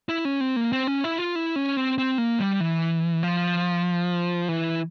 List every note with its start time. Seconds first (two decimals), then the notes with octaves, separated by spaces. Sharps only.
0.09 E4
0.25 C#4
0.41 C4
0.56 A#3
0.72 C4
0.87 C#4
1.04 E4
1.19 F4
1.35 E4
1.56 C#4
1.77 C4
1.98 C4
2.18 A#3
2.40 G3
2.61 E3
3.23 F3
4.49 E3